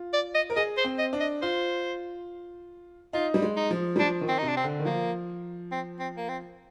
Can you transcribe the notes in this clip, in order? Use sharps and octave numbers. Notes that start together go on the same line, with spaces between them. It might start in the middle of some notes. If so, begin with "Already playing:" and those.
Already playing: F4
D5
D#5
A#4
G#4 D#5
C5
C4
D#5
D4
D#5
F4 C5
D#4 F4
G3
G#3
D#4
F3
G3
F3 D4
D#3
C4
D#4
C3
D4
C4
D3
D#3
F3 A#3
C4
C4
A#3
C4